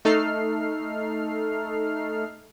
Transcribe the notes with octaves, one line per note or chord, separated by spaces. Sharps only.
A3 D#4 A4 F6 C7